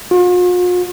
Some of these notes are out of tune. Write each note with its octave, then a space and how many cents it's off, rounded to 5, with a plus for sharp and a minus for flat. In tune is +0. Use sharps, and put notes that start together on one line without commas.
F4 +45